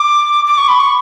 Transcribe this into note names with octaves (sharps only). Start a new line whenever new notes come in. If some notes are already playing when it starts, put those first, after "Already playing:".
Already playing: D6
D6
C#6
B5
C#6